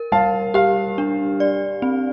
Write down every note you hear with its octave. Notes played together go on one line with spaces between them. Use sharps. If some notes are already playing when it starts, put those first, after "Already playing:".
Already playing: A#4
G3 F5 A5
G4 F5
D4
D5
C4